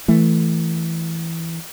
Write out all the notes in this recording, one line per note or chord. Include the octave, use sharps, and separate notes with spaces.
E3 A3